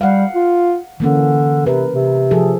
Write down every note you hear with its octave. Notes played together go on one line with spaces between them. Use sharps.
G3 F5 F#5
F4
D3 E3 A#3 C#4
C3 A#4 B4
C3
F3 G#4 A4